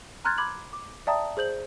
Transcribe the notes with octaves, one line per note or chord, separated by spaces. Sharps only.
A#5 C6 F6 F#6 G#6 A6
B5 D6 G#6 F#7
D6
D5 E5 G5 A5 A#5 D#6
G#4 C5 G6 F#7